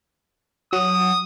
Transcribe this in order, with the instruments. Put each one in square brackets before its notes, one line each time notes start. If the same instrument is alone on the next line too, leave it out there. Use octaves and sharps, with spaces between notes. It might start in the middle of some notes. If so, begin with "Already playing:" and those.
[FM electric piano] F#3 F#4 [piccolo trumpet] D#6